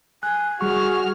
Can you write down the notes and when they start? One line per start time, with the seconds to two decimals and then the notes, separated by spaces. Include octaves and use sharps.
0.23 G#5 F#6
0.61 G3 F#4 G#4 C#6 F6